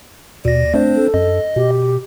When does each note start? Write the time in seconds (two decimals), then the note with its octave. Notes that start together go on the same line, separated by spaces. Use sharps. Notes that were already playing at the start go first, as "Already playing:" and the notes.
0.45 D#2 B2 D5 A#6
0.74 A3 C4 D4 C5
0.96 A4
1.14 F#2 D#5
1.56 B2 G4